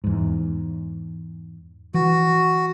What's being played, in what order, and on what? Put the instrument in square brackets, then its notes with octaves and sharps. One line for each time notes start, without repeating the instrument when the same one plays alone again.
[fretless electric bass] E2 G#2
[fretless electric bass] E3 [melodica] F#4